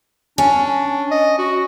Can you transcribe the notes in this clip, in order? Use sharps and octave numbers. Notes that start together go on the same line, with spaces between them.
C#4 D4
D#5
F#4